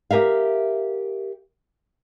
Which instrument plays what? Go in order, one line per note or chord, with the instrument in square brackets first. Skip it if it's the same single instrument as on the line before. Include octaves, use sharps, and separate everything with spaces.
[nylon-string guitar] G4 G#4 A#4 E5 F5